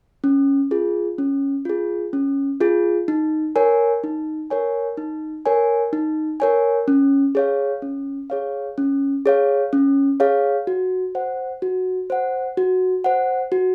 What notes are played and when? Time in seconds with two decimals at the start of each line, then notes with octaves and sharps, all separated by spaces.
0.24 C#4
0.71 F4 G#4
1.18 C#4
1.65 F4 G#4
2.13 C#4
2.61 F4 G#4
3.08 D#4
3.56 A#4 C#5 G#5
4.04 D#4
4.50 A#4 C#5 G#5
4.97 D#4
5.46 A#4 C#5 G#5
5.93 D#4
6.40 A#4 C#5 G#5
6.88 C#4
7.35 G#4 C#5 F5
7.82 C#4
8.30 G#4 C#5 F5
8.78 C#4
9.26 G#4 C#5 F5
9.73 C#4
10.20 G#4 C#5 F5
10.67 F#4
11.15 C5 F#5
11.62 F#4
12.10 C5 F#5
12.57 F#4
13.04 C5 F#5
13.52 F#4